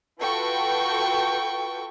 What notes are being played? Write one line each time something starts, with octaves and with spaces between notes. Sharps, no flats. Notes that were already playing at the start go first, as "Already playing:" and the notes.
F4 F#4 A4 B4 G5 C#6